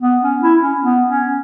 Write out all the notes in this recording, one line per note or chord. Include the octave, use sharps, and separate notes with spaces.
B3
C#4
E4
C#4
B3
C#4